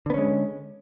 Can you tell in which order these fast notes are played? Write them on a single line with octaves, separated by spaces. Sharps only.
D3 B3 C#4 G#3